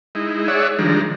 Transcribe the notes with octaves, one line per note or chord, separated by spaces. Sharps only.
G#3 D#4 E4
G#4 C#5 D5 E5 F#5
D#3 F3 G3 G#3 D4 A#5